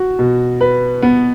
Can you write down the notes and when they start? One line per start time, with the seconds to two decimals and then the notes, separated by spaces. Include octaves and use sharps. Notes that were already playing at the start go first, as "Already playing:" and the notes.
Already playing: F#4
0.19 B2
0.61 B4
1.02 B3